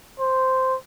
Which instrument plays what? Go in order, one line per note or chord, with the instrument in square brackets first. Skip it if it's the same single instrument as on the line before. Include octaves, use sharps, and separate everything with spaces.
[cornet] C5